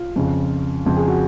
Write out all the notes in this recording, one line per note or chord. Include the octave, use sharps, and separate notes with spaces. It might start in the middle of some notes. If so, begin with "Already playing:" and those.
Already playing: F4
F2 C#3
F2 C#3
G#4
F#4